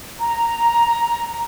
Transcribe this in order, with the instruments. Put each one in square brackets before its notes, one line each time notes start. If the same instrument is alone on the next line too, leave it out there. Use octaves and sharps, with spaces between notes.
[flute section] A#5